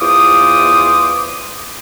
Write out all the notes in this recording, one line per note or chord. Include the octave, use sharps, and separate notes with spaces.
E2 F4 C5 D6 D#6